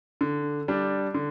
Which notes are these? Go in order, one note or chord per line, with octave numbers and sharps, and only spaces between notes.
D3
G3 D4
D3